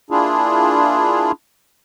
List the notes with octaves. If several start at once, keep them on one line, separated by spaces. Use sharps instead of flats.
A#3 D4 E4 F4 G#4